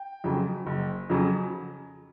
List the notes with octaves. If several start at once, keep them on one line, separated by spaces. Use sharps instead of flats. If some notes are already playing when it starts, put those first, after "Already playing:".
Already playing: G5
F2 C#3 F#3
F#1
F2 C#3 F#3